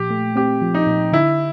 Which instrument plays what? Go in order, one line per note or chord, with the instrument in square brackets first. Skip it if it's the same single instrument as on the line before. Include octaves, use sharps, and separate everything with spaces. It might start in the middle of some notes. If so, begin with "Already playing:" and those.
Already playing: [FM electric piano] A#2 F3 [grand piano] G4
[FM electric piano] A3
[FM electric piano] C4 [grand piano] G4
[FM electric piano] F3
[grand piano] D#4
[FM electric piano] A#2
[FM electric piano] D3 [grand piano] E4